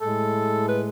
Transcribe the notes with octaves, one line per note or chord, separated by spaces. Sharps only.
A2 G#3 A4
B4